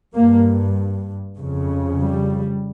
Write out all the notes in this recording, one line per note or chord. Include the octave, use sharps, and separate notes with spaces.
G2 A#3
F2 C#3
G3